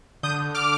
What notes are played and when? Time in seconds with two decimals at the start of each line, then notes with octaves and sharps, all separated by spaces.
0.23 D3 D#6 G6
0.55 D6 F6